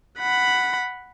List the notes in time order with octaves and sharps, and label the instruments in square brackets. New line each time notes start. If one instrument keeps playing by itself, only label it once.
[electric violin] F#5 B5